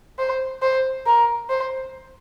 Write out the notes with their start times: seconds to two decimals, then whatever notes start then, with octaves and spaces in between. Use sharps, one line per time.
0.19 C5
0.62 C5
1.06 A#4
1.49 C5